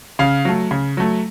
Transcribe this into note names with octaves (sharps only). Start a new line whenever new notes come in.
C#3 F5
F#3 A3
C#3
F#3 A3